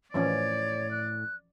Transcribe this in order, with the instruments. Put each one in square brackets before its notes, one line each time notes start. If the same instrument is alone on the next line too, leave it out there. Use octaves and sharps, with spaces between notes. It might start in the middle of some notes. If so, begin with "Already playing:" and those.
[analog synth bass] A2 [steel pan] E3 F3 C#4 [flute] C#5 [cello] D5
[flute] F#6